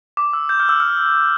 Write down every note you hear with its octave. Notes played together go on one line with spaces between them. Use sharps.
D6
E6
G6
F6
E6
F6